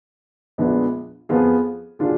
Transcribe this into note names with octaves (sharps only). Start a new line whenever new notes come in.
A#1 A#2 G#3 B3 D4
F2 F3 B3 F4 G#4
A#2 F#3 D4 F4 G#4